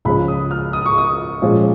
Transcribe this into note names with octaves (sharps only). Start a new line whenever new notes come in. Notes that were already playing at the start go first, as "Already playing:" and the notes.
C#2 C#3 F3 G#3 C#4 B5
D#6
F6
D#6
C#6
D#6
A#2 F3 G#3 C#4